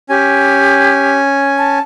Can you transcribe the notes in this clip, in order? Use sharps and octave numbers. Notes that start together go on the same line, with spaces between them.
C#4 G4 G#5
A5